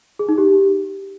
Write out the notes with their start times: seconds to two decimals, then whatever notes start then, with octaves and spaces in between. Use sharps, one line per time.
0.19 G#4
0.29 D#4
0.38 G4